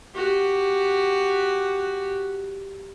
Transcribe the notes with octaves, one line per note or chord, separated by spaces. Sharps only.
F#4 G4